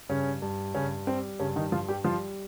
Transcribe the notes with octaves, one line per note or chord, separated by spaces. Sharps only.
G2 C#3 C#4
G2
G2 C#3 C#4
G3 C4
G2 C#3 C#4
D#3 D#4
G2 F3 F4
G3 G4
F3 G3 F4